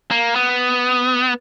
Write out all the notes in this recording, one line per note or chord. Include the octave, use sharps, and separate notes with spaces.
A#3
B3